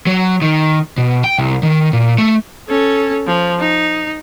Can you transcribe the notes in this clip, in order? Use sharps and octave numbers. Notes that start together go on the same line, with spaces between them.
F#3
D#3
B2
G5
C2
D#3
A#2
A3
C#4 A4
F3
D#4